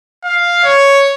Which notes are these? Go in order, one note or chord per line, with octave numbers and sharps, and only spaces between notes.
F5
C#5